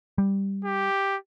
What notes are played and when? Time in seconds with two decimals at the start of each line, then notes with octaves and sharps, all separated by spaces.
0.18 G3
0.65 G4